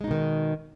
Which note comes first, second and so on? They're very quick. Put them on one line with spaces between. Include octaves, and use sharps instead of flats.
G#3 D#4 B2 D#3